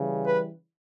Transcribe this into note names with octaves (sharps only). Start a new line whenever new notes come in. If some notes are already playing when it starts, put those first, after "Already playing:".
Already playing: C#3 E3 G3
B4